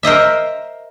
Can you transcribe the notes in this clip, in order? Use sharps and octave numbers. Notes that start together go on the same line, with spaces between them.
A#4 C5 D#5 E5